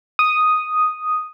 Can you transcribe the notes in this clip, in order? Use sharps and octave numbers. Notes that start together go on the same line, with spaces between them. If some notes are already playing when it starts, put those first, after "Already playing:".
D#6